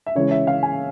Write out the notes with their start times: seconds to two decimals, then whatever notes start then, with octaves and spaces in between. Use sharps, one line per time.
0.06 E5
0.15 C#3 E3 G#3 C#4 C#5
0.31 E5
0.47 F5
0.63 G#5